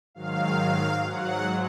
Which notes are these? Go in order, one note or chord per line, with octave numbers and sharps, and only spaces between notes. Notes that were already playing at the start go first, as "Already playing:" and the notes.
G#2 D#3 F#3 F5
G#2 F#3 F#5